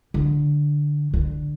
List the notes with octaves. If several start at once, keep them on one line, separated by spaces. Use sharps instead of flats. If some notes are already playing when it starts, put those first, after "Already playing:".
D3
D3